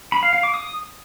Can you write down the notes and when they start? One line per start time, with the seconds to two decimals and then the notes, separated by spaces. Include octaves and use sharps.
0.12 B5
0.23 F5
0.33 F5
0.43 D6
0.54 D#6